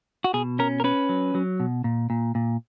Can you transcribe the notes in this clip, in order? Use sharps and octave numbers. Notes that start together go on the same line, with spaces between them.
F#4
B2 G#4
C#4 A#4
A#4
C#4 B4
F#3
F#3
B2
A#2
A#2
A#2